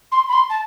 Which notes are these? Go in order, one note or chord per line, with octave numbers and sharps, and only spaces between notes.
C6
B5
C6
A5